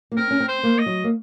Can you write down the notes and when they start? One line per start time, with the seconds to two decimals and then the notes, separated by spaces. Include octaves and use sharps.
0.12 A#3
0.17 C4 A#4
0.31 C#4
0.40 C4
0.48 C5
0.63 A#3
0.78 D#5
0.86 F#3
1.04 A#3